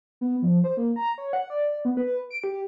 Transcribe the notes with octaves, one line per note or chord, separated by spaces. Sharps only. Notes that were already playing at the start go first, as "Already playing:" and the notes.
B3
F3
C5
A#3
A#5
C#5
F#5
D5
B3
B4
D7
G4